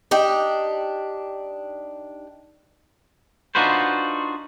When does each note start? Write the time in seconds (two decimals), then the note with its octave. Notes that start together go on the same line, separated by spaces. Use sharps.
0.11 D4 D#4 G4
3.55 D4 D#4 F4 F#4 B4 C5